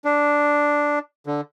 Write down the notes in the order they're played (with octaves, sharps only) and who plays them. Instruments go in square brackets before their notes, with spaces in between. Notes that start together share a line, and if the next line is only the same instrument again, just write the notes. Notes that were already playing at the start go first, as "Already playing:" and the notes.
[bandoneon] D4
D3